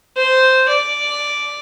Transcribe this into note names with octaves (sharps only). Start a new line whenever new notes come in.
C5
D5